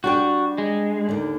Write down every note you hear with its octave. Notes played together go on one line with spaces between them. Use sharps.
G3 D4 F#4 G4
G#3
D#2 D3